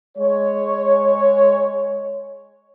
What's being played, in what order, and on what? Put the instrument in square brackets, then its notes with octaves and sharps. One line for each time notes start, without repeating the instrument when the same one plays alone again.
[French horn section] G#3 C#5